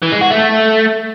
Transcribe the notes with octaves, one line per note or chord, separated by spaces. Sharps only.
E3
G#3
F#4
A3